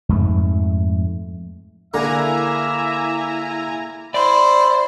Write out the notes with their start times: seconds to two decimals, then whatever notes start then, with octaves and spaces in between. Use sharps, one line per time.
0.09 F2 G#2 A3
1.94 D3 A#3 E4 G#4 E5 G#5 A#5
4.14 E4 C5 D5